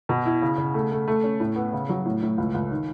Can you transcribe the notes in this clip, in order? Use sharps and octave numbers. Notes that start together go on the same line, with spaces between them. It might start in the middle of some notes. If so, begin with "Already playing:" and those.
B2
E4
C#3
C#3
A3
A3
A3
C#4
A2
B3
C#3
F#3
A2
A2
C#2
C#2
D#3